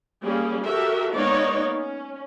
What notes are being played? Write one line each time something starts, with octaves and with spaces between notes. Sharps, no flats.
G3 A#3 C#4 G#4
F#4 G4 A4 A#4 E5
G#3 A#3 B3 D#4 C#5 D5
C#4